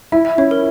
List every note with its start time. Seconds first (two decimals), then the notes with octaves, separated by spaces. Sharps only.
0.12 E4 E5
0.25 E5
0.38 C#4 C#5
0.51 A#4